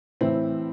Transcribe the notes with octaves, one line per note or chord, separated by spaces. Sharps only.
A2 E3 C4 E4